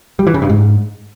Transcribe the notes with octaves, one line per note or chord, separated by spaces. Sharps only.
G3
E3
C#3
G2
G#2